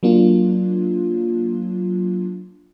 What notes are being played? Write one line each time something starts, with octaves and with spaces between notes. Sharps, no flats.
F#3 A#3 D4 F4